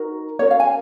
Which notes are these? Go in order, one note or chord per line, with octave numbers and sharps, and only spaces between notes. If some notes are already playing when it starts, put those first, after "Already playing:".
Already playing: D#4 F#4 A#4
C#4 F#4 A#4 C#5
F5
G#5